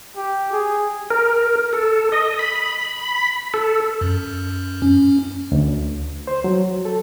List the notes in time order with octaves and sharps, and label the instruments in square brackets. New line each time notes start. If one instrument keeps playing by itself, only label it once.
[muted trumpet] G4
G#4
[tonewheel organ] A#4
A4
D#5
B5
A4
[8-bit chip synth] F#2
C#4
[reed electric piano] D2
C5
F#3
A4